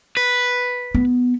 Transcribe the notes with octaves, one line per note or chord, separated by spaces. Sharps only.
B4
B3